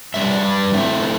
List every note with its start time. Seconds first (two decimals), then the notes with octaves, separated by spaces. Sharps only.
0.14 G2 G3 D4 E5
0.44 D5
0.73 A2 A3 C4 E5